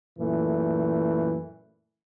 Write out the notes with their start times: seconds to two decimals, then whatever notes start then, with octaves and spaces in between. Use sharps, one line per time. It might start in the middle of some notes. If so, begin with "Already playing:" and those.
0.19 F#2 A#2 E3 A3